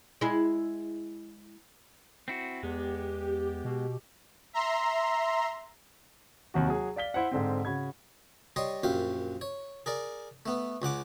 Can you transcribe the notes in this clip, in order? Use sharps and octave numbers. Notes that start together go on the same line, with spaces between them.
G#3 E4
C4 E4 F#4
E2 G#3 B3 G4
B2
E5 A#5 C6
D#2 C3 F#4
F#3 G#4
D5 F5 B6 G7
E4 C5 F#5
G#2 D3 C4
C#3 F#4 B5 G#6
G3 C#5 D#5 C6
A#1 F#2 G4 F5
C#5
G#4 A#4 D5
A3 B3
C#2 C#3 F#5 D6